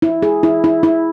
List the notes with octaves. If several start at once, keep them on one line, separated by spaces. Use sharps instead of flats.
E4
G#4
E4
E4
E4